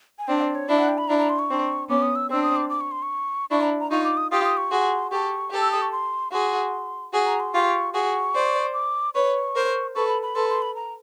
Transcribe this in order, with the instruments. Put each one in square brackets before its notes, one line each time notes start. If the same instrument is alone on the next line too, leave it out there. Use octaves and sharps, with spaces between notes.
[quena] G#5
[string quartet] C4 D4 [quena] G5
[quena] D5
C#5
[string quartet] D4 E4 [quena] D5
[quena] F#5
G5
B5
[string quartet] D4 E4 [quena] A#5
[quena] A#5
C6
C#6
[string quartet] C4 D4
[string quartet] B3 C#4 [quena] D6
[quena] D#6
E6
[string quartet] C4 D4 [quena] E6
[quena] D#6
D6
D6
C#6
C6
C#6
[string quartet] D4 E4 [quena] C#6
[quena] A#5
A#5
[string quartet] D#4 F4 [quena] C#6
[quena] D6
D#6
[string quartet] F4 G4 [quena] D#6
[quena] D#6
C#6
[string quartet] F#4 G#4 [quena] C6
[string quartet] G4 A4 [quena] C#6
[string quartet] G4 A4
[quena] E6
D#6
C#6
C6
[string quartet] F#4 G#4 [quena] C6
[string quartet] F#4 G#4
[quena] A#5
C6
[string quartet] F4 G4 [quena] C#6
[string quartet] F#4 G#4 [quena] C#6
[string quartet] C5 D5
[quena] D6
[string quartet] B4 C#5 [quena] C#6
[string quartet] A#4 C5
[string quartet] A4 B4 [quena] C#6
[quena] B5
B5
[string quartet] A4 B4 [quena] C6
[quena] C6
B5
A#5